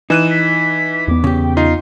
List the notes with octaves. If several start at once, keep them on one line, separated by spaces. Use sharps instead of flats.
E3 D#4 F#6 D#7 E7
B6
E2 B3 D6
C#3 G4
G5
D#4 F4 C7